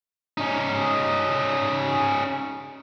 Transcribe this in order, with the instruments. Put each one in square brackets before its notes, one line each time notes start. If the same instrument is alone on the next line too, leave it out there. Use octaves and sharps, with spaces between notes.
[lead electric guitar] C#4 D#4